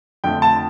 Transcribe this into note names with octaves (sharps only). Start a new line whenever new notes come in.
F2 D3 A3 G5
A5